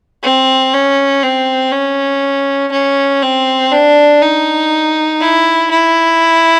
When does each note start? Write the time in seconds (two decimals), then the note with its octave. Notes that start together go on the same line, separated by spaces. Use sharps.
0.24 C4
0.74 C#4
1.23 C4
1.72 C#4
2.72 C#4
3.22 C4
3.72 D4
4.22 D#4
5.21 E4
5.71 E4